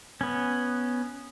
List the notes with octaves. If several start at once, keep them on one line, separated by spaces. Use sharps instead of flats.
B3 C#4